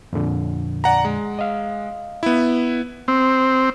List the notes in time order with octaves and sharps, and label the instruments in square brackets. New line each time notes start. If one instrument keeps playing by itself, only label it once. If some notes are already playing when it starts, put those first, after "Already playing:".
[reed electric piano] F2 A#2 D3
[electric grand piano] D5 F#5 A#5
G#3
[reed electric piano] D#5 F5
[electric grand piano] B3 E4
[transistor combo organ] C4